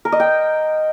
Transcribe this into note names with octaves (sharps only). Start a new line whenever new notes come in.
A#4
D#5
G5